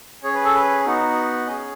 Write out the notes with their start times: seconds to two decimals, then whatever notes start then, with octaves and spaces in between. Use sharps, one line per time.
0.23 C#4 G#4 C#5
0.34 B4
0.45 A4
0.54 B4
0.86 B3 D#4 F#4
1.47 C#4 G#4 D#5